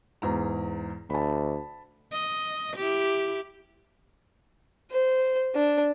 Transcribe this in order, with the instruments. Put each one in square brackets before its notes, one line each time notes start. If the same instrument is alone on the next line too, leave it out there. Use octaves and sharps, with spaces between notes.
[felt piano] E2 G#2 A#5
[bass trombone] D2 [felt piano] A5 B5
[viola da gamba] D#5
E4 G4
[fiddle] C5
D4